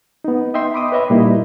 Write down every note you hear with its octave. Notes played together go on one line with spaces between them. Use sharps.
B3 D#4
D#5 E5 G5 C6
B5 D6 D#6
B4 C#5 D#5 E5 B5
A#2 G3 A#3 D#4 E4